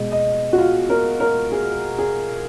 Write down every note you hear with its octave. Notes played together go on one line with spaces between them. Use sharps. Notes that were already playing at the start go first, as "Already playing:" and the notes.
Already playing: B2 G#3 D#5
D#5
F#4
F4
A#4
A#4
G#4
G#4